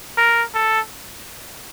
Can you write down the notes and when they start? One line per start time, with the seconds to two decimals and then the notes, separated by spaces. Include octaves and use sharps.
0.18 A#4
0.54 A4